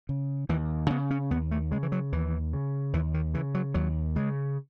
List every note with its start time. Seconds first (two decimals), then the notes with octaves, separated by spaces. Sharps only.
0.09 C#3
0.49 D#2 E3
0.90 C#3 B3
1.11 C#4
1.31 D#2 B3
1.51 A3
1.71 C#3 G#3
1.83 E3
1.92 F#3
2.12 D#2 E3
2.53 C#3
2.93 D#2 E3
3.14 D#3
3.34 C#3 E3
3.54 F#3
3.74 D#2 F#3
4.16 C#3 G#3